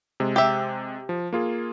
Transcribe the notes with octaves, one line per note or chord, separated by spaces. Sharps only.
C3 G#3
G4 E5
F3
A#3 F4 G#4